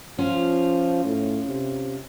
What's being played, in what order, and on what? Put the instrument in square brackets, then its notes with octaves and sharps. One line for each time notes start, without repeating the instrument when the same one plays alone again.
[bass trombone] F3 [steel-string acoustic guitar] C#4 F4
[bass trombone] A2
C3